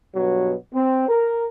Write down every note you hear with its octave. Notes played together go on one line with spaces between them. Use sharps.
G2 B2 F#3
C4
A#4